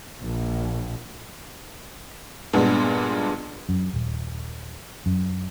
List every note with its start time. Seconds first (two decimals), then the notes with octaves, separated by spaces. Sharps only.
0.22 A#1
2.53 G2 A#2 G#3 B3 D4
3.69 F#2
3.94 D#1
5.06 F#2